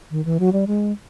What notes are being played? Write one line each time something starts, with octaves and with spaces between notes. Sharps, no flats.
D#3
E3
F#3
G3
G#3